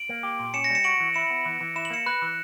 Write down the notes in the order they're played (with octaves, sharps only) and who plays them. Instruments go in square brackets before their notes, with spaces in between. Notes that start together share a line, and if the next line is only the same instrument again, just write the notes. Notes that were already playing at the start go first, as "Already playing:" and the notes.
Already playing: [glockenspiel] D7 F#7
[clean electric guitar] A#3
G4
A#2
[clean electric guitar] C#4 [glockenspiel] C#7 E7
[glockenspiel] A#6 C#7
[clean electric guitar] G3
[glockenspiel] C#7 E7
[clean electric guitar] F#4 [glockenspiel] D7 F#7
[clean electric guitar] E3
[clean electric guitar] E4 [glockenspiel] C#7 E7
[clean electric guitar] B3
E3
E3
[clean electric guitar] E4 [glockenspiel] E7
[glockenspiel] F#7
[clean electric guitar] A#3 [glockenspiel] C#7 E7
[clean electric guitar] B4 [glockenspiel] F#6
[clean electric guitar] E3